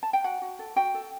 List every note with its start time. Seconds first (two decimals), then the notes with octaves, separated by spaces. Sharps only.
0.03 A5
0.13 G5
0.24 F#4 F#5
0.42 F#4
0.59 A4
0.76 F#4 G5
0.94 A4